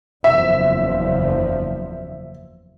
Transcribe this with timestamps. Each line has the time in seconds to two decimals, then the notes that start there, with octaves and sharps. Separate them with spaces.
0.24 F#1 E2 F3 E5